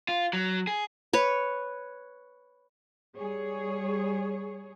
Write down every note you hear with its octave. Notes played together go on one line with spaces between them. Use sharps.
F4
F#3
G#4
B4 C#5
G3 G#4 C#5